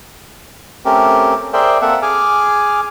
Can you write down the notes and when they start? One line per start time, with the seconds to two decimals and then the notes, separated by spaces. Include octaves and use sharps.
0.85 A3 C4 C#4 G4 A#4
1.53 G#4 A#4 C5 D5 E5 G5
1.82 A#3 C4 A4 E5 F#5
2.02 G#4 G#5 D6 F6